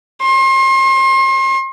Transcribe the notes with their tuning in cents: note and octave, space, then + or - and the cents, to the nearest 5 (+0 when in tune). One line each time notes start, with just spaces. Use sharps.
C6 +35